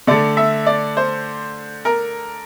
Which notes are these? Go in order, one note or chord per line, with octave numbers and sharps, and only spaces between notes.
D3 A3 D5
E5
D5
C5
A#4